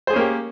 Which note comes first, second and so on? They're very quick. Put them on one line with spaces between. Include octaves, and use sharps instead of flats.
C5 G#4 C#4 A#3 G4